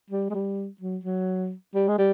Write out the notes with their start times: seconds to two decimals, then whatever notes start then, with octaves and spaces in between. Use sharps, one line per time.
0.10 G3
0.30 G#3
0.34 G3
0.81 F#3
1.04 F#3
1.74 G3
1.88 G#3
1.98 G3